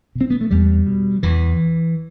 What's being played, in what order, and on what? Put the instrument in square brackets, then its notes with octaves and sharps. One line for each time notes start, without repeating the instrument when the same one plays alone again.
[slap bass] B2
C4
B3
A3
E2 G3
B2
E2 E3